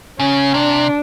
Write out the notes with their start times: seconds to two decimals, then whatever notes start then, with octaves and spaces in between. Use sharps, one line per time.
0.19 C#3 C#4
0.54 C3 D4